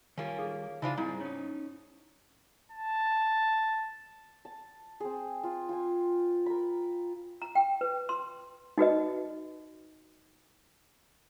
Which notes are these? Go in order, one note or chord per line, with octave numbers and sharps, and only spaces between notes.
D#3 G3 A#3 C#4 F4
G#4 A4 F5
C#3 E3 D4 D#4 F4 C5
G#2 G3 C4 E4 G#4
C#4 D#4 C#5
A5
A5
C4 G#4
F4
F4 G5 G#5
A#4 B5
A#5
G5
B4
C6
D#4 F#4 B4 D#5